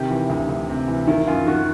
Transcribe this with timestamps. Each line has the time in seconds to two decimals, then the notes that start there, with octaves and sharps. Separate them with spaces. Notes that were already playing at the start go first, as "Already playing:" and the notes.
Already playing: C3 D#3 G4
0.10 E3
0.30 D2
0.49 D2
0.69 C3
0.88 E3
1.07 D#3 E4
1.27 F#2 F4
1.46 D#3 F#4